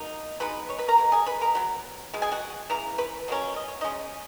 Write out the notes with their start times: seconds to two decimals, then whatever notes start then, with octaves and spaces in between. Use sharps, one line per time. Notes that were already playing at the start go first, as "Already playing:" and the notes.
Already playing: B2 A#3 D#4
0.40 B2 G#3 D#4 B4 B5
0.69 C#5 C#6
0.78 B4 B5
0.88 A#4 A#5
0.98 B2 G#3
1.12 G#4 G#5
1.26 B4 B5
1.41 A#4 A#5
1.55 F#3 B3
2.13 B2 G#3
2.22 G#4 G#5
2.32 F#4 F#5
2.70 C#3 E3 A#5
2.98 B4 B5
3.28 B2 F#3 A#3 C#4
3.56 D#5
3.68 C#5
3.81 C#3 G#3 C#4 D#4 D#5